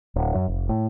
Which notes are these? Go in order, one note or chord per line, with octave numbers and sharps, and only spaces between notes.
D1
F#2
F1
A2